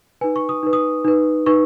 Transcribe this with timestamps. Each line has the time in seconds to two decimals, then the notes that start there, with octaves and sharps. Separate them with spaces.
0.21 D#4 B4 G#5
0.36 C#6
0.49 D#6
0.63 D#4 B4
0.73 D#6
1.05 D#4 B4
1.46 D#4 B4 C#6